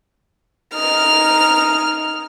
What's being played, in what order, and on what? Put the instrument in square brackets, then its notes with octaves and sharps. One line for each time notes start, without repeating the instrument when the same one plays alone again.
[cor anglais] D#4 [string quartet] F6